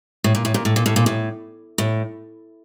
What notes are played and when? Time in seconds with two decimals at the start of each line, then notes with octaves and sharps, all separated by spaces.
0.24 A2
0.35 A#2
0.45 A2
0.54 A#2
0.65 A2
0.76 A#2
0.86 A2
0.96 A#2
1.06 A2
1.78 A2